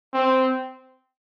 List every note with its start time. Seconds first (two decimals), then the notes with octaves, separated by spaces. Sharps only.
0.14 C4